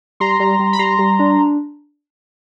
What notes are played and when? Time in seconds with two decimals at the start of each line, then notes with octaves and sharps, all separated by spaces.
0.20 G3 A#5 C6
0.40 G3
0.59 G3
0.73 B5
0.79 G3 A#5 C6
0.99 G3
1.19 D4